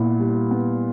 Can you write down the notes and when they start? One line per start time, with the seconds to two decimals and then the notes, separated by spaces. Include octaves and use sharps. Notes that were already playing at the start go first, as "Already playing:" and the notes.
Already playing: A#2 B3 E4
0.20 G3
0.51 B3